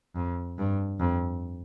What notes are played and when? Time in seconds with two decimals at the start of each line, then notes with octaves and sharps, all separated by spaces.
0.15 F2
0.58 G2
1.00 F2